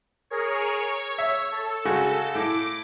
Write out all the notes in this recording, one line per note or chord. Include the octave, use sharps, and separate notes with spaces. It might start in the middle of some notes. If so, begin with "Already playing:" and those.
G#4 A#4 C#5
C#5
E5
A4
C#3 G#3 F#4
A2 D6